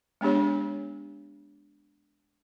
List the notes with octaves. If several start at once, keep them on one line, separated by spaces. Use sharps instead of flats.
G#3 B3 D4 G4 C#5